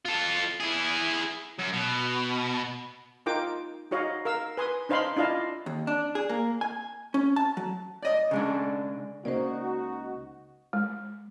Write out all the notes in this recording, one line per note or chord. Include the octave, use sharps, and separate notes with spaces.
F4 A4
E4 G#4
F#2
B2
D#4 F4 A#4 G5 D6
D#4 F#4 C#5 D#5 F5
A#4 F5 E6
B4 G#5 C6 D#6
D4 D#4 C5 F5 B5 C6
D4 E4 F4 D#5 F5 A5
D#2
D4
G#4
A#3
G#5
C#4
A5
F#3
D5 D#5 D#6
C#3 G#3 D4
C#2 C#3 A#3 D#4 F#4 C5 D5
G#3